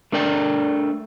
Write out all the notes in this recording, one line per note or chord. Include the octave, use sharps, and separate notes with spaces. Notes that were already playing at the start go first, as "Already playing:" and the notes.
A3 D4 A#4 D5 G5